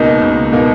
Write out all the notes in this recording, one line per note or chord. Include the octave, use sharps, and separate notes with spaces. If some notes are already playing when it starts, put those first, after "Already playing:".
Already playing: C#2 B2 A#3 D#4
C#2
B2 A#3 D#4